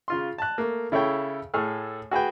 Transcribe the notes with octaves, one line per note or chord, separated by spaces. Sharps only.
C#3 F4 C6
A5 F#6
A3 A#3
C#3 E4 A4 C#5 G5
A2 G#4 A4 F6
F#4 G#4 B4 G5